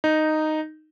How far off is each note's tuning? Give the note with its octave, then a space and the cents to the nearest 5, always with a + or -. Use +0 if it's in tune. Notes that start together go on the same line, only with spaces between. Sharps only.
D#4 -5